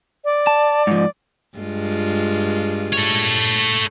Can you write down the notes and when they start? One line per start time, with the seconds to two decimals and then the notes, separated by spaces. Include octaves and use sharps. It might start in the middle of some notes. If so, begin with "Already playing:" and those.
0.25 D5
0.47 A5
0.87 G#2 F3
1.57 G2 G#3 F4
2.93 A4 C#5